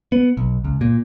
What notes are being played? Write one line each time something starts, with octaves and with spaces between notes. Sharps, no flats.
B3
B1
C#2
A#2